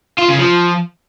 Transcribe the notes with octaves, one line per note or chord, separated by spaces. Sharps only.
F4
C#3
F3